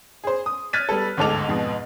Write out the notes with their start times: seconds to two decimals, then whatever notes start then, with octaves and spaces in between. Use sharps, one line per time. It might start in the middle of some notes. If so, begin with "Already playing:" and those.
0.24 G#4 C5
0.46 D#6
0.73 F6 F#6 G#6 A6 B6 D#7
0.89 G3 B3 A4
1.17 G1 D2 G#2 A4 D6 F7
1.49 F2 G#2 B2